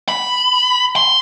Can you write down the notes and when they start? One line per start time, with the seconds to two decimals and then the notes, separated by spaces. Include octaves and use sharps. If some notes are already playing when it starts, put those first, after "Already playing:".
0.09 B5
0.96 C6